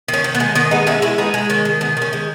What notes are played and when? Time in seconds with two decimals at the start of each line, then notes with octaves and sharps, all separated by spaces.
0.08 D#3
0.14 C#4
0.24 D#3
0.35 B3
0.40 G#3
0.55 D#3 B3
0.71 G#3 B3 D#4
0.87 G#3 C#4 E4
1.02 G#3 C#4 E4
1.18 G#3 B3 D#4
1.34 G#3
1.50 D#3 C#4
1.65 D#3
1.81 D#3 B3
1.97 D#3 C#4
2.13 G#3